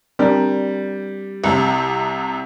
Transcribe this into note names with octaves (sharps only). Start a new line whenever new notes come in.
G3 C4 D4 A#4
C2 C3